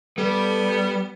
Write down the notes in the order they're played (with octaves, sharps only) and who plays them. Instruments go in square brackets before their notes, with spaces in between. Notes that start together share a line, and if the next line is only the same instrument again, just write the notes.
[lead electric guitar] G3 [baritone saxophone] B3 [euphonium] A4